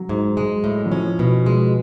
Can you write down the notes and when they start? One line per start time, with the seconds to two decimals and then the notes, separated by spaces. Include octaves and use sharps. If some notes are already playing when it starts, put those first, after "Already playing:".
Already playing: F#3
0.09 G#2
0.37 G#3
0.64 A2
0.86 F#3
0.91 F3 C#4
1.19 B2
1.46 G#3